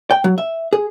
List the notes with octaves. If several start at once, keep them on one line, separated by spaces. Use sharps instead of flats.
G5
F#3
E5
G#4